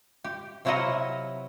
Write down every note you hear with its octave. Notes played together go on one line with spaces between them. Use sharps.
G4
C3 F#3 E4 F4 D#5 F#5